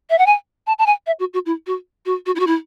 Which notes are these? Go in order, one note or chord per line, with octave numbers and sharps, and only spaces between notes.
E5
F#5
G#5
A5
A5
G#5
E5
F#4
F#4
E4
F#4
F#4
F#4
E4
F#4
E4